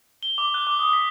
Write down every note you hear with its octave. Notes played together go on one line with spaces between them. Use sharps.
G7
D6
F#6
D6
D#6
B6